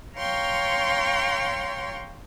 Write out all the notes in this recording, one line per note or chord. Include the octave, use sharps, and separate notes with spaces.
C#5 F5 G5 A#5 C6 C#6